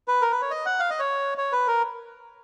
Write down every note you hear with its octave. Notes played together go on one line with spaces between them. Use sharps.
B4
A#4
B4
C#5
D#5
F#5
F5
D#5
C#5
C#5
B4
A#4